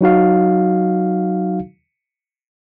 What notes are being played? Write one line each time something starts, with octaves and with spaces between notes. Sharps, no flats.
F#3 D#4 F#4 F5